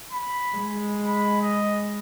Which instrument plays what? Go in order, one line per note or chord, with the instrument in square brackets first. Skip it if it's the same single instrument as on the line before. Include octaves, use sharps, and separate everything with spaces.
[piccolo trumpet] B5
[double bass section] G#3
[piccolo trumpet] B5
D#5